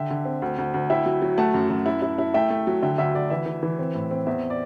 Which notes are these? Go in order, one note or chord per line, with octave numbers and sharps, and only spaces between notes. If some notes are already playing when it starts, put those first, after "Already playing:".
Already playing: D3 E5 G5
D3
C4
D2
D2
D2
E4 E5 G5
F#3
F#3
A3 F#5 A5
F#2
F#2
E4
E4
E4
A3 E5 G5
A3
F#3
D3 E5 G5
D2 E5
D2 D5
E3 E5
E3
E3
C4
A2
C4
E2 E5
D5